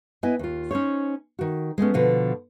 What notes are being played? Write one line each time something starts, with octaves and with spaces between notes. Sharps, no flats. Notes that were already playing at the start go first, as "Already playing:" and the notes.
B3 E4 D#5 G#5
D#2 F4
C#4 D#4 C5 C#5
D#3 F#4
G#3 A3 B3 C#4
B2 D3 F3